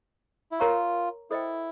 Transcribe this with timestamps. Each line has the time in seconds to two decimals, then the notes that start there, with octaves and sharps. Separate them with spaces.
0.52 E4
0.59 F4 A#4 C#5 F#5 A#5 C#6
1.31 E4 A4 C5 D#5 G5